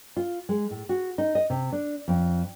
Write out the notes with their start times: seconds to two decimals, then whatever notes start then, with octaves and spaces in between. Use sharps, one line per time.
0.17 F4
0.49 G#3
0.71 A2
0.89 F#4
1.18 D#4
1.35 D#5
1.50 C3
1.72 D4
2.08 F2